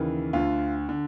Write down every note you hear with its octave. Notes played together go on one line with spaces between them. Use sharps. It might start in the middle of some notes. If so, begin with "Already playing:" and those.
Already playing: D#2 C#3 E3
D2 D3 F4
D3